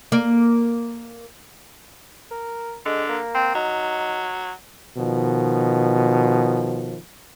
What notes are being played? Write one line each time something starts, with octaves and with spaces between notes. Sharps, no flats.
A#3 D5
A#4
D3 G#3
A#3
C4
F#3 D#4
B2 D#3 F3